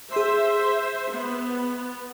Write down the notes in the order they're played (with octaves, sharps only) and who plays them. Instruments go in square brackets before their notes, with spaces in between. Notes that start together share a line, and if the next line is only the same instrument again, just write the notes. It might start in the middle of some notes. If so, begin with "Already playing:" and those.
[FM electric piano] G#4 C6 [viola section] C5 E5
[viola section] B3